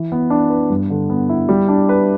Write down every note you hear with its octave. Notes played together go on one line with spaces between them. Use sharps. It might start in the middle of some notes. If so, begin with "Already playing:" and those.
Already playing: E3
B3
D4
B4
G2
D3
B3
E4
G3
D4
B4